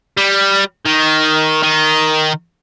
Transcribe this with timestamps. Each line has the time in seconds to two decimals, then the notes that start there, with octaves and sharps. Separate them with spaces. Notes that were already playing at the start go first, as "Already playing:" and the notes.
0.17 G3
0.85 D#3
1.63 D#3